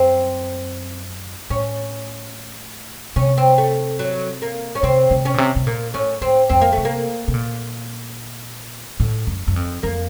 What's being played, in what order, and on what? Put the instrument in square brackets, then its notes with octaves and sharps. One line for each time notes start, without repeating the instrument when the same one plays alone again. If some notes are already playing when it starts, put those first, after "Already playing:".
Already playing: [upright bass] F#2 [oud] C4
[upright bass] A2 [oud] C#4
[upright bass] C3 [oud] C#4
[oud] C4
A3
F#3
A#3
C#4
[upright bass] C3 [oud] C4
[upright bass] C3
[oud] C#4
[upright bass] A#2
C3
C3
[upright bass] A#2 [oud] A#3
[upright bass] A2 [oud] C#4
[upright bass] A2 [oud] C4
[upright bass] F2 [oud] C4
[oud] A#3
A3
[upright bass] C3
[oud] A#3
[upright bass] C3
A#2
A2
F#2
F#2
F2
[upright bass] F2 [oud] A#3